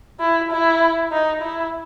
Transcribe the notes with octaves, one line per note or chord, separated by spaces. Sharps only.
E4
E4
D#4
E4